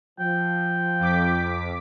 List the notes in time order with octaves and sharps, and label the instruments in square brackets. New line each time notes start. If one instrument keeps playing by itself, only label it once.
[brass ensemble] F3 [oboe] G5
[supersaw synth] F2 D6 B6